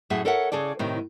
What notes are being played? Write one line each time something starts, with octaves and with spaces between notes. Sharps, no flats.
F#2 A2 G#4 E5 F#5
A4 A#4 C#5 E5 F#5
C#3 G#4 A4 D5
A2 C3 D#3